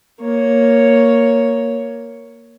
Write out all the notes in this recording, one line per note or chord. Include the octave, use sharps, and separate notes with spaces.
A#3 C#5